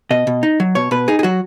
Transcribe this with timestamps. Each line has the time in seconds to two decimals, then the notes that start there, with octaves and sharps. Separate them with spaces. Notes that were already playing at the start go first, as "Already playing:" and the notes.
0.11 B2 D#5
0.27 B2
0.43 D#4
0.60 F#3
0.75 B2 C#5
0.91 B2 B4
1.08 D#4 G#4
1.19 G#4
1.23 F#3 F#4